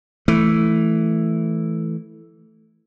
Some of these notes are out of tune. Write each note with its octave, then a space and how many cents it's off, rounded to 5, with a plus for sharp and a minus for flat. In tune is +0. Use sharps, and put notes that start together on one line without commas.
E3 +0 A3 +0